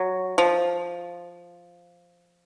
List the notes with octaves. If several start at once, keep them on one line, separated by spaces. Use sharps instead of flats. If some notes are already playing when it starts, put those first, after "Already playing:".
Already playing: F#3
F3